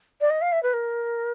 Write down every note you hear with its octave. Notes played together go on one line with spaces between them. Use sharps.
D5
D#5
F5
E5
B4
A#4